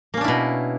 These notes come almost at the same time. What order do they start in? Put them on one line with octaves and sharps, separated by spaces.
A#3 C#4 D4 E4 B2